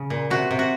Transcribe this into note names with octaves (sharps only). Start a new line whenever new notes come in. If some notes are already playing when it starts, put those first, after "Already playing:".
Already playing: C#3
A#2
C3 F#4
C3
F#4